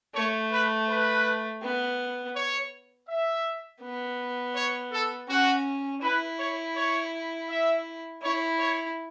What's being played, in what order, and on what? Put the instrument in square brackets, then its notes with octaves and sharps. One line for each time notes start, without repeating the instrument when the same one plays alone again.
[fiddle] A3 [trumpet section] C#5
[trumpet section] B4
B4
[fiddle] B3
[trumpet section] C#5
E5
[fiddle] B3
[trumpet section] C#5
A4
[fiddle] C#4 [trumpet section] F#4
[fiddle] E4 [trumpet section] B4
[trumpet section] C#5
C#5
E5
[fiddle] E4 [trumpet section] C#5
[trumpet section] C#5